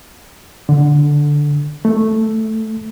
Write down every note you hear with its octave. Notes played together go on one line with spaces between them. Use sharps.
D3
A3